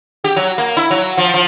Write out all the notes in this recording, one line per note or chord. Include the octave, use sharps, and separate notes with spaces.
G4
F#3
A#3
E4
F#3
F3
F3